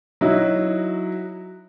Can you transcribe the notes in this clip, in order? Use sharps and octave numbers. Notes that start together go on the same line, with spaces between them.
F#3 D#4 E4 F#4